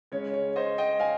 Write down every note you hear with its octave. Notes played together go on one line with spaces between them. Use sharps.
C#3 G#3 C#4 C#5
C#5
C5 D#5
D#5 G5
F5 G#5